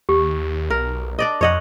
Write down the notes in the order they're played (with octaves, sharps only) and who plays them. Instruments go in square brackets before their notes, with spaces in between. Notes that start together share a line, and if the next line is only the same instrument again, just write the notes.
[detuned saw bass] D#2 [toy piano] G4
[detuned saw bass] B1 [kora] A#4
[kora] D4 D5 D#5
[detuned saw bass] F2 [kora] C#5 D#5 F#5